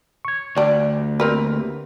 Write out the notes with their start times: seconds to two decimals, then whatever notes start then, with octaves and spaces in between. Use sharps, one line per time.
0.25 C#6 G#6
0.56 D2 G3 D4 D5
1.20 A#3 C4 G4 A#4 B4